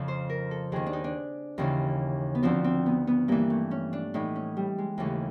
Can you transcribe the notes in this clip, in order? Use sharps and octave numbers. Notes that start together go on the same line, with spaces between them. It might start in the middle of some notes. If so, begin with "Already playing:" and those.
Already playing: F2 C#3 F3
C5
A#4
A4
D#2 D#3 G#4
D4
D#4
D4
D#2 C#3 E3
B3
D2 D3 F3 C4
C4
B3
B3
G2 E3 A#3
A3
C#4
D4
A2 E3 D#4
C#4
G3
G#3
D#2 C#3 E3 A3